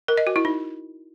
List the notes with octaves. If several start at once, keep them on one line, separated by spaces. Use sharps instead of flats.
A#4
D#5
F#4
E4
D#4